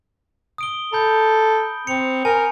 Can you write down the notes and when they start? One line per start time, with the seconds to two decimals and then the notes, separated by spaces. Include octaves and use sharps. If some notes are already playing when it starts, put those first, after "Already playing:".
0.58 D#6 D7 G7
0.93 A4 A#5 B5 G6
1.87 C4 C#7 F7
2.25 A#4 G#5